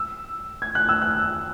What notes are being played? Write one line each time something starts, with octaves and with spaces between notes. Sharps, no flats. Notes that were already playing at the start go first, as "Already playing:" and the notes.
Already playing: E6
G#6
F#6
E6
F#6